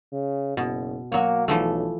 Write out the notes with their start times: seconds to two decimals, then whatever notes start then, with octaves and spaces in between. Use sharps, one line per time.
0.12 C#3
0.57 F#1 B2
1.12 F#3 A#3 C#5
1.48 B1 E3 F3 A3